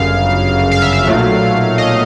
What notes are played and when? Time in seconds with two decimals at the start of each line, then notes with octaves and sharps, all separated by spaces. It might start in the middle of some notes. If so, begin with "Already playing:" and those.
Already playing: G1 F#2 C#3 F5
0.72 F5
0.82 E5
0.93 F5
1.07 B1 A#2 F#3 A3
1.78 D#5